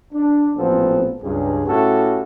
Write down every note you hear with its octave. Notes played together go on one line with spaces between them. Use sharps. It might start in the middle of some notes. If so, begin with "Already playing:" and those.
D4
A1 A#2 F3 B3 C4 A4
C#2 G2 G#4
A2 C#4 E4 F#4 G4 A4